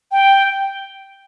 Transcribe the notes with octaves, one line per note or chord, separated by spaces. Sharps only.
G5